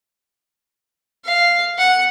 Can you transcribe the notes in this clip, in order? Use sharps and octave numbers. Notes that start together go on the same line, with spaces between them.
F5
F#5